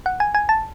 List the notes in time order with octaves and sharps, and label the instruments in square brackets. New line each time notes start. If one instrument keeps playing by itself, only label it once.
[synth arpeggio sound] F#5
G#5
G#5
A5